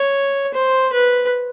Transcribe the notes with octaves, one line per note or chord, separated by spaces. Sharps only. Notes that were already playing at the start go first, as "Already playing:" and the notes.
Already playing: C#5
C5
B4